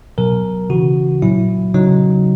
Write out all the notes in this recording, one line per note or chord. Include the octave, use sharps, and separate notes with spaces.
B2 F#3 A#4
C#3 E3 F#4
A#2 F#3 E4
C#3 F#3 D#4